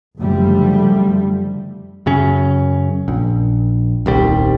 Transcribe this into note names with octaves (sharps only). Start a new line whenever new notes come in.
F#1 D3 F3 G3 A3
F#2 C#3 C#4
A#1
D#1 C2 G3